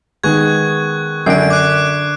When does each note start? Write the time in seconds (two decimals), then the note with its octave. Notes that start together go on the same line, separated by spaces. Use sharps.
0.24 D#3 G#3 B3 C#6 F#6 G#6
1.26 F#2 D3 D4 C7 D7
1.50 D6 F#6